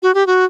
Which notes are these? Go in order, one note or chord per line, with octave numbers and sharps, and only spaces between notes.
F#4
G4
F#4